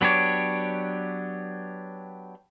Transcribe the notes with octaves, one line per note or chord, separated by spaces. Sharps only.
F#3 B3 D4 G4 C#5